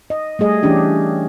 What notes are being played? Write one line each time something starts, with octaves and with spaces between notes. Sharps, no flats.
D#5
G3 A3 G#4 D#5
E3 C#4 D4 G4